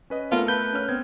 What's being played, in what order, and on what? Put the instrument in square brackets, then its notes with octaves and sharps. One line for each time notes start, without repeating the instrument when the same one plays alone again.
[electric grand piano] C#4 B4 D#5
[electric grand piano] A3 A#4 [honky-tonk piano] B3 A4 [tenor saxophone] F4
[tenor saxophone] B4 [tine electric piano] G6
[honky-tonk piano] C#4 F6
[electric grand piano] B3 C4 G#6